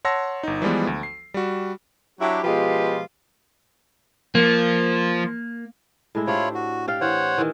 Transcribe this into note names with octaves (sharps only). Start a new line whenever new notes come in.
C#5 F#5 A5 C6 E6 A#6
G1 D#4
E3 F3 G3 G#3 B3
D2
C7
G3 F#4
F#3 D4 E4 G4
B2 F3 G#3 F4 G4 B4
F3 A#3
A2 G#3 E4
D4 E4 F4 G4 C5 C#5
F#4
G4 D5 F5
E3 C5 C#5 F#5
D#3 E3